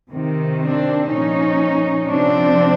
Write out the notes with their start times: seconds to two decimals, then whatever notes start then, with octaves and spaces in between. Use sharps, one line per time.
0.12 C3 D#3
0.61 C4 D4
1.10 A#2 F3 C#4 D#4
2.08 C3 F3 C4 D4